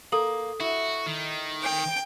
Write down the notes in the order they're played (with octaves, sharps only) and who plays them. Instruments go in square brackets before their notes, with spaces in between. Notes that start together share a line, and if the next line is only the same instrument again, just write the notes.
[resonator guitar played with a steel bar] A#3 [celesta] A4 D#6 F#7
[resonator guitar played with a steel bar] E4 [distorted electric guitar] F#4
[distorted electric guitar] D#3
[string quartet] G5